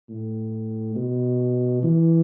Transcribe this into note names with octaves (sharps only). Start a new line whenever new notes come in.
A2
B2
E3